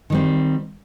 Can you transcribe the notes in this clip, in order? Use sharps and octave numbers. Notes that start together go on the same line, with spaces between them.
D#3 G3 C4